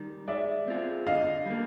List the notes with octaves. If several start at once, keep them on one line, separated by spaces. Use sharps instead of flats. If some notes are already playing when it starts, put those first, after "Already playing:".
Already playing: D#3 G3
G#3 D5 E5
C4 F4 G#4
D3 D#5 F5
G3 A#3